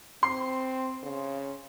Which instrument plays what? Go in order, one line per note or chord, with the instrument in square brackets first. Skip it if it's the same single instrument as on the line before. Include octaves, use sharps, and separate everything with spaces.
[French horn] C4 [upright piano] C6 C7
[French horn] C#3